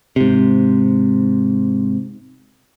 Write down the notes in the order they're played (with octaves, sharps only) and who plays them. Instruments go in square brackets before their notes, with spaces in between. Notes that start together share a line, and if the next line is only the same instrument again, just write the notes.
[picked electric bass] G#2 C3